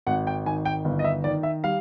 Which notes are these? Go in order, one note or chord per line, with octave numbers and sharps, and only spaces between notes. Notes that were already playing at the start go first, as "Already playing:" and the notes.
G#1 F#5
G5
D#3 G#5
G5
G1
D#5
E5
D#3 D5
E5
G3 F5